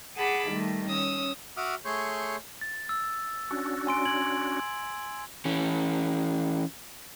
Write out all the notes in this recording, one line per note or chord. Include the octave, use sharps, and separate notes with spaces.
G#4 F#5 G#5 A5 B5 D6
D#3 G3 A3
C#4 D#6 E6
F#4 E5 F#5 D6 D#6 F6
A3 G#4 C#5 C6 C#6 G6
A6
E6
C#4 D4 F#4
G#5 C6 D7
G#6 F#7
E3 C#4